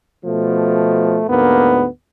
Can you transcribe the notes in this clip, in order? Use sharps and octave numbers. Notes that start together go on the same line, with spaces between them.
B2 F3 A3
D2 G#2 A#3 B3